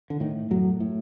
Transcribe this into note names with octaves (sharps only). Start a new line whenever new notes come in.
D3
A2 D#3
F#2 A2 F#3
A2